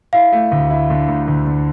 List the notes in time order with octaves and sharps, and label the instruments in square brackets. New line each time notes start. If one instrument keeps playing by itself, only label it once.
[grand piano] E4 [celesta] F5
[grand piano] A3
D2
E4
D3
D2
D2
D3